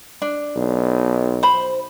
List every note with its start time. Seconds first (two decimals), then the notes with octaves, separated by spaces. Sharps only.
0.22 D4
0.56 B1
1.43 C5 B5